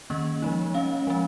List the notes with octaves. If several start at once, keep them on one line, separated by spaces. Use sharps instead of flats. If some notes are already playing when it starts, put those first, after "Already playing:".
D#3 A#3 C#4 D#5
F3 G#3 D#4
G#3 C#4 F5
F3 G#3 C#4